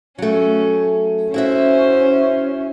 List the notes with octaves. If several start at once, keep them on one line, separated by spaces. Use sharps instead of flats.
F#3 A3 C#4
C#4 E4 F#4 C5 E5